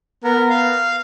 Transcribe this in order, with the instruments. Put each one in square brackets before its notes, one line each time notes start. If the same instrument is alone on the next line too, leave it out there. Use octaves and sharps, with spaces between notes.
[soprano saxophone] B3 [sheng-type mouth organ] A#4
[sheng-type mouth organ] F5